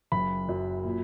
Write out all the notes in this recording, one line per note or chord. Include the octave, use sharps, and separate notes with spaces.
F#1 B5
F#2
A#2